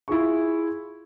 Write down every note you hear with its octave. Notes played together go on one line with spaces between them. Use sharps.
E4 F4 G#4 C#6